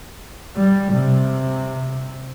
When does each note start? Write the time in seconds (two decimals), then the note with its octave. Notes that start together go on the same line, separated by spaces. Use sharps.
0.56 G3
0.93 C3